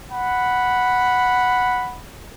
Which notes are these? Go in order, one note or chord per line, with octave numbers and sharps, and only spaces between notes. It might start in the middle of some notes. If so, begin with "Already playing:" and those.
F#5 B5